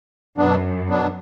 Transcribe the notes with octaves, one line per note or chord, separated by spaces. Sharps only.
F#2 B2 F#3 B3 D4
B2 F#3 B3 D4